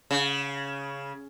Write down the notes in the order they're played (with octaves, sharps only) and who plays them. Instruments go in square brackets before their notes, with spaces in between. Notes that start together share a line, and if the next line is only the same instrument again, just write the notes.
[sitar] C#3